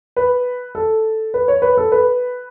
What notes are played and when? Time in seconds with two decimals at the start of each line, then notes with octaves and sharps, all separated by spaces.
0.17 B4
0.75 A4
1.34 B4
1.48 C#5
1.62 B4
1.77 A4
1.92 B4